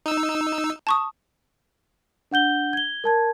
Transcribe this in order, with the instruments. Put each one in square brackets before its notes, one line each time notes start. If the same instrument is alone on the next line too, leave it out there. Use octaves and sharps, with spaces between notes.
[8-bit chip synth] D#4 E6
[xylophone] A5 C#6 D#6
[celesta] D4 F#5 G6 G7
G#6 G7
A#4 A5 G#6